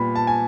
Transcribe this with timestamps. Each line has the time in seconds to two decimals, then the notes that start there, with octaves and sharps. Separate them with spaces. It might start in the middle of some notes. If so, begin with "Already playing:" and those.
Already playing: A#2 G3 B3 B5
0.15 A5
0.27 G#5